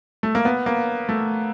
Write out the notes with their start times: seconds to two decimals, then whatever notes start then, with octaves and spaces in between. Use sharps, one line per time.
0.23 A3
0.35 A#3
0.45 B3
0.66 A#3
1.09 A3